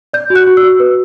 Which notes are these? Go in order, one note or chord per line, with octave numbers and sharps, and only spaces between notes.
D5 G6
F#4
F#6
F#4
E6
F#4
B4